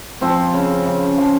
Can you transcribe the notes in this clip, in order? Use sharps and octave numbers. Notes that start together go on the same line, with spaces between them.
F3 C4
C#3
C#3
F3